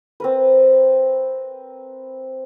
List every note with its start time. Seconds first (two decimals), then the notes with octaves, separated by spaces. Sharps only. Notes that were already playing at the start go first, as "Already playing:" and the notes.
0.20 C4 A#4 B4